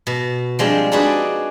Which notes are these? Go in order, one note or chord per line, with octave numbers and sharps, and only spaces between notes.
B2
F3 G3 G#3 C4 D4
D4 D#4 F#4 G#4 B4 D5